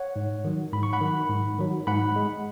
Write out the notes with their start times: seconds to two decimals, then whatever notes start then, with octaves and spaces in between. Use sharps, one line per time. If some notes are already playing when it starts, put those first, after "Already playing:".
Already playing: C#5 F#5
0.16 G#2
0.44 D#3 F#3
0.73 G#2 B5
0.83 C#6
0.93 F#5 B5
1.01 D#3 F#3
1.30 G#2
1.59 D#3 F#3
1.87 G#2 F#5 B5
2.16 G#3